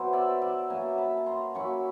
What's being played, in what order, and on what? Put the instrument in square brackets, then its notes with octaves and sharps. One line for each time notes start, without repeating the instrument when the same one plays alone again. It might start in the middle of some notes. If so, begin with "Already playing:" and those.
Already playing: [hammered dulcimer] F#3 B3 E4 C5
D5 E5
D5 E5
F#3 A#3 C#4 G#5 A#5
A5 B5
A#5 C6
F#3 A#3 C#4 E4 B5 C#6